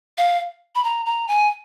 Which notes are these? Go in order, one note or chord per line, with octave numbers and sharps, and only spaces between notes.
F5
B5
A#5
A#5
G#5